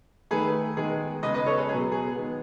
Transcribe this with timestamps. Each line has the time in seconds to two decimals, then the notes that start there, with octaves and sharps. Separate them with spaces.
0.31 D#3 A3 G#4 B4
0.77 D#3 G#3 B3 G#4
1.23 C#3 G#3 B3 B4 D#5
1.34 B4 D#5
1.46 A4 C#5
1.58 G#4 B4
1.69 B2 F#3 B3 G#4 B4
1.92 G#4
2.15 D#3 G#3 B3